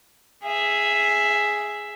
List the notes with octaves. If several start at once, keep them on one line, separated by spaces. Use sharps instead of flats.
G#4 E5